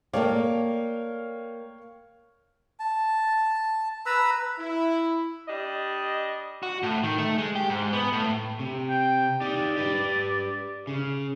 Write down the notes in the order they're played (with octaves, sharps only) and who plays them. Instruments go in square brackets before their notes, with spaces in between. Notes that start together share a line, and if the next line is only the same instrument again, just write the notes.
[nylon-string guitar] A#3 A4 D5 [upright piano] C#5 F5 G5
[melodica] A5
B4 A#5 B5 E6
[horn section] E4
[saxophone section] G3 D4 D#5
[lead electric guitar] F#4
A2
D#3
A3
G#3
G4
G#2
B3
A2
[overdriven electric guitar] C3
[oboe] G5
[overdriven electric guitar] D#4 G4 [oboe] D5
[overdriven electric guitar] G4 B4
C#3